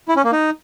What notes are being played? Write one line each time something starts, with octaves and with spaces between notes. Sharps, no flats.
E4
C#4
A#3
D#4